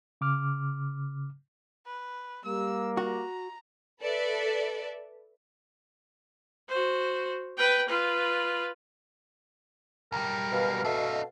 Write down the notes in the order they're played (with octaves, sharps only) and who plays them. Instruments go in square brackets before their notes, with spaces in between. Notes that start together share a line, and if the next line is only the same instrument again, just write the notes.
[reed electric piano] C#3 D6 F6
[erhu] B4
[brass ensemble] G3 A#3 [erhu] E6
[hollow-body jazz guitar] F#4 [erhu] A#5
[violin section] A4 B4 D5 E5
[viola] F#4 C5
B4 G5
F4 B4
[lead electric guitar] B1 G3 [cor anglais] A#4
[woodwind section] B2 F5 [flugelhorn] B4
[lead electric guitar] D4 D#5 [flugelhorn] A4 [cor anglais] E5